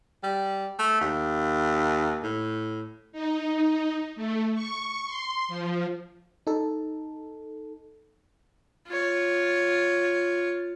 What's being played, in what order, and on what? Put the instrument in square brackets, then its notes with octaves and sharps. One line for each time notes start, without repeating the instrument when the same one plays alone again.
[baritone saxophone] G3
A3
D#2
A2
[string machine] D#4
A3
C#6
C6
F3
[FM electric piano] D#4 A4
[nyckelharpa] F4 C#5